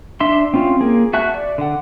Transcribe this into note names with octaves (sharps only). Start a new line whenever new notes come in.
D4 E5 C6
C4 C#4 F4
A#3 G#4
F#4 E5 A5 F#6
D5
D3 F#5